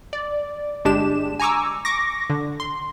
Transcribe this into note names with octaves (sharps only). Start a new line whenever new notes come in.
D5
G1 G#3 D4 G4 E7
G#5 A#5 C#6 D6 E6
C#6 D6 A#6
D3
C6